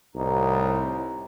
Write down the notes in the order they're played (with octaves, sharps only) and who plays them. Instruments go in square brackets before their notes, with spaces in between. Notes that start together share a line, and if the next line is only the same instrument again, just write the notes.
[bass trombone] C2 [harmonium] A2 D#4